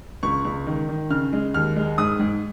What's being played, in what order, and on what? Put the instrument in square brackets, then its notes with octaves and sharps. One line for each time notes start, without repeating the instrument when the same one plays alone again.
[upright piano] C#2 C#6
C#2
D#3
D#3
C#3 F6
G#3
D#2 F6
G#3
G#2 D#6
G#2